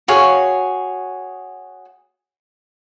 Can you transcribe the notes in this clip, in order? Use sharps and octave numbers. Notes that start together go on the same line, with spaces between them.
F#4 G#4 C#5 F5